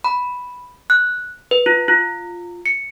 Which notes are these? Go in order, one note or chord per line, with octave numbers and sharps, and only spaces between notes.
B5
F#6
B4
F4
F4
C#7